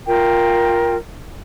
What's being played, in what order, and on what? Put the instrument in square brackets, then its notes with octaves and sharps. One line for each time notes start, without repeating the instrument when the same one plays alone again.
[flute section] F4 A#4 G5